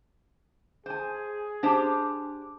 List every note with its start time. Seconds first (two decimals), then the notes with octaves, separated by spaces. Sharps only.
0.86 G#4 C5 G#5
1.63 D4 G4 C5